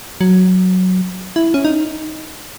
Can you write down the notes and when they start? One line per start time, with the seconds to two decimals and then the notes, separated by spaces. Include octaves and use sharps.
0.21 F#3
1.36 E4
1.54 C#4
1.65 D#4